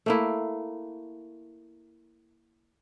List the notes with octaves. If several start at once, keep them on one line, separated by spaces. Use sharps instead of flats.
A3 A#3 E4